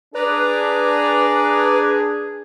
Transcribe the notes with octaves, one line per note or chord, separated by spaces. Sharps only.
D4 G#4 B4 D5 A#5